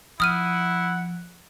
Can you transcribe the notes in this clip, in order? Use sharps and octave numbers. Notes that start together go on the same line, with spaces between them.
F3 E4 F#5 D#6 F6 D#7